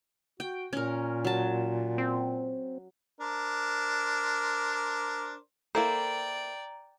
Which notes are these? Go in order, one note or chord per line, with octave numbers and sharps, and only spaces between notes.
F#4 G5
A#2 C#4 A#4
F#3 A5
C4
D4 A#4 C5
A#3 E4 A4 A#4 C5 D5 G5 A#5